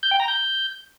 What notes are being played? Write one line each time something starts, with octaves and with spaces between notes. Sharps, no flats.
G6
G5
A#5
G6